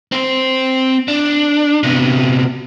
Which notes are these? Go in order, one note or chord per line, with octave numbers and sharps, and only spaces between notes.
C4 C5
D4
C3 B3